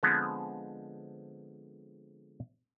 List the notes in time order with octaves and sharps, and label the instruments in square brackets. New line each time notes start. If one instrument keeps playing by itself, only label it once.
[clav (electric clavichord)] D3 F3 G#3 B3 C4